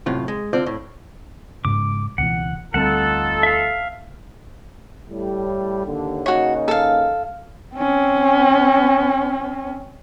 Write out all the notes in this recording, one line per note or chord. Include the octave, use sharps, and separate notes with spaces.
F#2 A2 C3 F4
G#3
D3 C4 F4 C5 D5
A2
G#2 C#3 D6
C#2 B2 E3 F#5
D2 G3 C4 D#4 F4 A4 F#5 A5
E5 F5
A2 G3
D#2 D3
C#3 A#3 D#4 F#4 C#5
A4 F5
C4 C#4